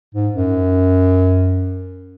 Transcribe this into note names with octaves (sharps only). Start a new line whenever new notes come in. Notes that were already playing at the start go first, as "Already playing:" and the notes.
G#2
F#2